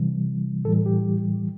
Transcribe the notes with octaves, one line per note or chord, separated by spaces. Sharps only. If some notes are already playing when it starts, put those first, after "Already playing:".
Already playing: C3 E3 G3
A2 E3 G3 A4
G4